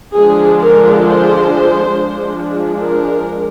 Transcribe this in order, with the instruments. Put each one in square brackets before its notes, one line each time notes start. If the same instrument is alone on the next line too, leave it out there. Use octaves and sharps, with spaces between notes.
[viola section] D3 F3 G#3 D4 G#4
A#4
C5
F3 G#3 D4
A#4